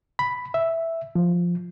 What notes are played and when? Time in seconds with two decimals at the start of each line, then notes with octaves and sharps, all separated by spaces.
0.19 B5
0.54 E5
1.15 F3